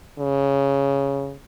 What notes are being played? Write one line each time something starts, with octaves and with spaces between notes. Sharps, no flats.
C#3